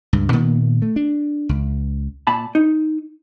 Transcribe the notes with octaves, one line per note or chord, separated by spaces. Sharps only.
C#2 G2
A#2 D#3 A#3 B3
A3
D4
C#2
A#2 A5 B5
D#4